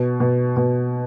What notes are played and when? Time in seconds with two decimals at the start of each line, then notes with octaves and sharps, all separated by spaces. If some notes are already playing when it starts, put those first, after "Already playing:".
Already playing: B2
0.20 B2
0.56 B2